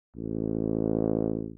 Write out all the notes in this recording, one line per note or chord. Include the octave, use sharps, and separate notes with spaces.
A1